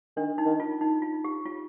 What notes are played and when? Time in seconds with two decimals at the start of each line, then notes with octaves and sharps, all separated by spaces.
0.17 D#3 D4
0.38 D#4
0.46 D#3
0.60 F4
0.81 D#4
1.02 F4
1.24 G4
1.46 F4